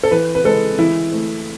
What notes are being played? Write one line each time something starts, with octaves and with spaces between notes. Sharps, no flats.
A4
E3 B4
B4
G#3 A4
E3 E4
A3